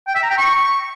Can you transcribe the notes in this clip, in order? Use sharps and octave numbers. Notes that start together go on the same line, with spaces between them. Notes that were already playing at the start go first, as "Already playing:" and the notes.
G5
E5
A#5
G5
C#6